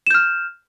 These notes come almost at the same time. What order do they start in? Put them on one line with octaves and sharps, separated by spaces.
E7 G6 F6